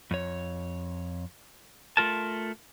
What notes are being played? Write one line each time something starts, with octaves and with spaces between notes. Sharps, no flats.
F2 C#5
A3 F4 A#4 A5